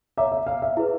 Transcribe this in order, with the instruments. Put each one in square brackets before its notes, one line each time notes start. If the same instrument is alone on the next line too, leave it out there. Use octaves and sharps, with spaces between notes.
[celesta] C#5 F5 A#5 D6 [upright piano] E5
[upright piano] E5
F5
E5
[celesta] E4 G#4 B4